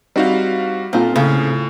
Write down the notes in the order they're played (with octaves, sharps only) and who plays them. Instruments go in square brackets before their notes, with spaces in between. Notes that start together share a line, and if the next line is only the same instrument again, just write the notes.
[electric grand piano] G3 F#4 F5 [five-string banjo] C4 D#4 E4
[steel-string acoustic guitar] A#2 [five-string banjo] C4 F4 A4
[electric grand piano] A2 [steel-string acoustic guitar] C#3